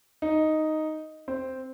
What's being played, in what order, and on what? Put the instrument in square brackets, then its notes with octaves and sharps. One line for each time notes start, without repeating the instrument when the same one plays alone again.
[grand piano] D#4
C4